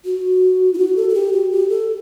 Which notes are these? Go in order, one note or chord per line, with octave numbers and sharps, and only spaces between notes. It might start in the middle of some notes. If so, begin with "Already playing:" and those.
F#4
E4
F#4
A4
A4
G4
F#4
G4
A4